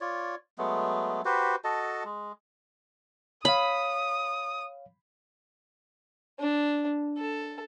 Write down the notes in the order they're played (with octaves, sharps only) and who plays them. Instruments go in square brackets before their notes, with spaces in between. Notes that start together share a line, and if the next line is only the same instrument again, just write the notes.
[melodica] F4 C#5 D5
F#3 G#3 A3 B3
F#4 G4 B4 C5
F#4 A4 D#5 A5
G#3
[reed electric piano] C#5 F5 [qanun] B5 [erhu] D#6
[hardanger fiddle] D4
A4